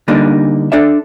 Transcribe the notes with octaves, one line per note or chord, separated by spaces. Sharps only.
D3 G3 A#3 D4 D#4
D4 A4 D5 E5